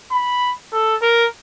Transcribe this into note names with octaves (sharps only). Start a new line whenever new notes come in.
B5
A4
A#4